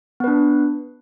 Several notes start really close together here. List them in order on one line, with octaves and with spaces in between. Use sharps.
B3 B4 D4